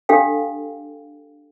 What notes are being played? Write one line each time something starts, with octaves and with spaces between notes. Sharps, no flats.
D4 G4 A4 F5 G5